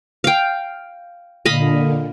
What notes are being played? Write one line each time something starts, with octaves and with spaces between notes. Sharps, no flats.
F5 G5
A#2 D3 D#5 F5 B5